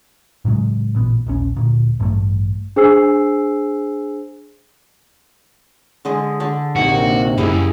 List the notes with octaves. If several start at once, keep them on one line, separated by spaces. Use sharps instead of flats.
A2 C#3 F#3 G#3
A1 A#2 B3
D#1 A#1 C#4
D2 A#2
A1 G2 G3 A3
D4 G#4 C5 G#5 E6 C7
D3 G#3 D#5
D3 D4
A#1 F2 C3 A#3 D#4 F#4 G4
F#2 C#3 G3 E4 G#4